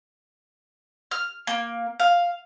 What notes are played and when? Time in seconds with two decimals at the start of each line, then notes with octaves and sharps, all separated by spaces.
1.11 F6
1.47 A#3
2.00 F5